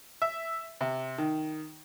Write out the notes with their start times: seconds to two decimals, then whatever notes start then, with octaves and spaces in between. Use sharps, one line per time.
0.22 E5
0.81 C3
1.18 D#3